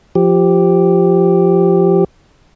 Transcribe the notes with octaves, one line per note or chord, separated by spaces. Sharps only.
F3 G4